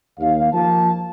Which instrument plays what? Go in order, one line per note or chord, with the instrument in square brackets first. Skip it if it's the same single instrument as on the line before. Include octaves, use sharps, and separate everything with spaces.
[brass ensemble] D#2 F5
F3 A#3 A5